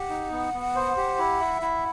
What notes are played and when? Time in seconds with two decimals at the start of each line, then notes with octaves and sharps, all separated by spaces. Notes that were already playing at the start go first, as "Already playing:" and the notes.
Already playing: G4 F#5
0.10 D#4
0.32 B3
0.53 B3
0.76 C5
0.97 G4
1.18 E4
1.40 E5
1.61 E4 F#5